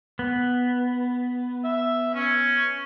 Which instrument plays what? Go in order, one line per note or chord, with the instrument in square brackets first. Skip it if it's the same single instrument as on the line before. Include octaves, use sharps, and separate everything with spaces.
[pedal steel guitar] B3
[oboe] E5
C#4